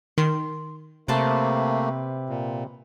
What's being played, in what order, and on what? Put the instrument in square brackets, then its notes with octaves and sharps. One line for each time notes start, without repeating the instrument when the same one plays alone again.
[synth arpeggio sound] D#3 [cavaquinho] C6
[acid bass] C3 [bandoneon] A3 A#3 [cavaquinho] B4 C5 A5
[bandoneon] A#2